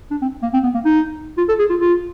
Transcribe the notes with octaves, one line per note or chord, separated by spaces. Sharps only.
D4
C4
A#3
C4
B3
A#3
D#4
F4
A4
G#4
F4
F4